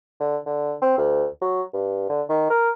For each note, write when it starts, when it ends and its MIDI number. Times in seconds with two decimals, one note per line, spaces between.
0.20 0.37 50
0.46 0.73 50
0.81 0.94 60
0.97 1.25 38
1.41 1.62 54
1.73 2.06 43
2.09 2.21 50
2.29 2.47 51
2.50 2.70 70